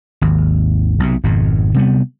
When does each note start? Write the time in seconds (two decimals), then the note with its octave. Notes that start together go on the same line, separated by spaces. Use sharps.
0.21 G#1 D#2
1.00 B1 C3
1.24 G#1 F2 B2
1.75 C3 G3 B3